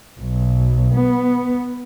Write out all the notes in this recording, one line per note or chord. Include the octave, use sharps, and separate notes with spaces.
B1
B3